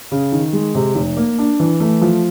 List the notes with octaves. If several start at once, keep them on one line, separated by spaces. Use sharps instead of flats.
C#3
D#3
G#3
C3
F1
A#3
D4
E3
A3
F3